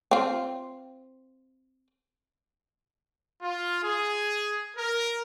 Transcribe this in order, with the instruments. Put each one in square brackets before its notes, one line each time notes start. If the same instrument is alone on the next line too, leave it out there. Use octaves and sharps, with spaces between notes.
[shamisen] C4 F4
[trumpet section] F4
G#4
A#4